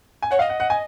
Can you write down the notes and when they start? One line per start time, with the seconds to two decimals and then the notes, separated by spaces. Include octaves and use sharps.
0.22 G#5
0.31 C#5 F#5
0.39 D#5 F5
0.49 F#5
0.60 F#5
0.70 G#5